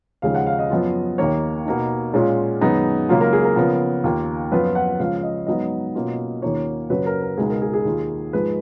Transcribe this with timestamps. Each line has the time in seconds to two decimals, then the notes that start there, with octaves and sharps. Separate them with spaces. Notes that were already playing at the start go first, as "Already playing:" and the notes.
0.22 D#2 C#3 F3 G#3 F5
0.34 F#5
0.47 F5
0.59 D#5
0.70 F#2 F3 B3 F4
1.18 D#2 D#3 A#3 C#5
1.65 B2 A#3 D#4
2.14 A#2 G#3 C#4 F4
2.61 F#2 D#3 G#3 B3 D#4
3.09 C#2 C#3 F#3 A#3 F4
3.21 A#4
3.33 G#4
3.44 A#4
3.56 C#3 F3 B3
4.04 D#2 D#3 A#3 F4
4.52 F#2 F3 B3 F4 B4
4.75 F#5
4.99 C#2 C#3 F3 F5
5.23 D#5
5.47 G#2 F#3 B3 D#4 D#5
5.95 B2 A#3 C#4 F4
6.42 D#2 D#3 A#3 C#4 F4 C#5
6.90 F#2 C#3 F#3 B4
7.06 A#4
7.22 A#4
7.37 C#2 B2 G#3 D#4 G#4
7.50 A#4
7.62 G#4
7.74 G#4
7.85 D#2 D#3 A#3 F4
8.33 G#2 F3 G#3 B4